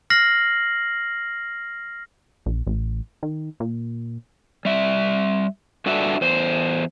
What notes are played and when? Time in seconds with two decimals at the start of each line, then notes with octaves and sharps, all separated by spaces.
0.10 F6 A#6 C7 F#7
2.46 A#1
2.67 A1
3.23 D#3
3.60 A#2
4.65 G3 E5
5.86 G2 D4 F#4 A4 E5
6.21 E2 C5